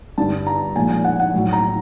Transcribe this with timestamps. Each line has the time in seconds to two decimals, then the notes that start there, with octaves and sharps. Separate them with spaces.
0.18 G2 D3 G3 A5
0.47 A#5
0.76 A#2 F3 G#3 G#5
0.91 G#5
1.04 F#5
1.19 F#5
1.34 A2 F#3
1.53 A#5